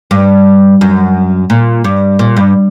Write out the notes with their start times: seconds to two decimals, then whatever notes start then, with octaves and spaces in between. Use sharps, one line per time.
0.11 G2
0.81 F#2
1.50 A#2
1.84 G2
2.19 A#2
2.37 G2